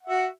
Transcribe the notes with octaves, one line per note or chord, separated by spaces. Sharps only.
F#4 E5 F#5